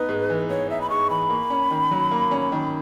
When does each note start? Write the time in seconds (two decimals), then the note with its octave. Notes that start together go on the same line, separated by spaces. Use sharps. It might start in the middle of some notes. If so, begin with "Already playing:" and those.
Already playing: B3 D#4 B4
0.09 G#2
0.30 E3
0.49 B3 C#5
0.70 D#4 E5
0.81 B5
0.90 G#2 C#6
1.10 E3 B5
1.30 A#3
1.50 C#4
1.71 D#3
1.91 F#3
2.11 A#3
2.31 C#4
2.52 D#3